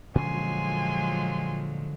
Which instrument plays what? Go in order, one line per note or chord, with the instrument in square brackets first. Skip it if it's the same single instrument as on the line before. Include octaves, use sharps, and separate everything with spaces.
[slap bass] A#2 C#4 [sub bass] D3 [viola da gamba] F3 F#3 G#3 [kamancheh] G#5 C6